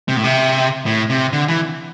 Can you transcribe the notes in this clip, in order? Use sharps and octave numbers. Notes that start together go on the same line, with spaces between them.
C3
A2
C3
A2
C3
D3
E3